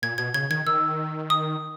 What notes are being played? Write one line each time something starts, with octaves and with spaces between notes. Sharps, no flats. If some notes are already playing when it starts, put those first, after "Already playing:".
A#2 G#6
B2 G#6
C#3 G#6
D#3 G#6
D#3 E6
D#6